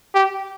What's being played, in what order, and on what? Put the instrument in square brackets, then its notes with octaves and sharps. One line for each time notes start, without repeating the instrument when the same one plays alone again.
[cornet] G4